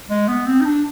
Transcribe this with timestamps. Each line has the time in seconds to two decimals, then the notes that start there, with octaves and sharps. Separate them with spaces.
0.10 G#3
0.28 B3
0.46 C4
0.61 D#4
0.65 D4